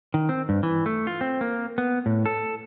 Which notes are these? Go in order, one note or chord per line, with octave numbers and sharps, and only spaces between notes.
D#3
C4
G2
E3
A3
F4
C4
A#3
B3
A2
A4